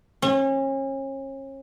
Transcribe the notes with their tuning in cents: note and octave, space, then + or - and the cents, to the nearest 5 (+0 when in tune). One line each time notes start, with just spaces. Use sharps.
C#4 -35